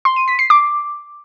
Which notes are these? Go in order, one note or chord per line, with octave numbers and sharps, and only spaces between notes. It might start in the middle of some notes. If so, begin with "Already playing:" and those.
C6
D#7
B6
C7
D6